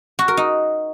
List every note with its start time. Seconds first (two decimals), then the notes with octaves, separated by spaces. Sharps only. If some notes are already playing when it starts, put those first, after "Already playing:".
0.19 F#4
0.28 A#4
0.37 D#4